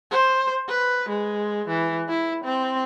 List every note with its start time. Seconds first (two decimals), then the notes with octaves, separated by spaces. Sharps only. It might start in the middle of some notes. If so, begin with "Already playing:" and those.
0.11 C5
0.69 B4
1.09 G#3
1.68 E3
2.09 E4
2.44 C4